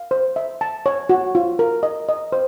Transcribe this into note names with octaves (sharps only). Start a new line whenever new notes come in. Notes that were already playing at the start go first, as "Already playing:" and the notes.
Already playing: F5
C5
E5
A5
C#5
F#4
F4
A#4
D#5
D#5
C5